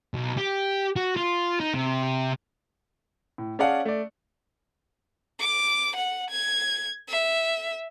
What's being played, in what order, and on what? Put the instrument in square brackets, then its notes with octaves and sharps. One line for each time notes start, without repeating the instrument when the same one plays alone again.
[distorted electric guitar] B1
G4
F#4
F4
D#4
C3
[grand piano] A2
C#4 G#4 D5 F5 F#5 A5
A3 D5
[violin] D6
F#5
G#6
E5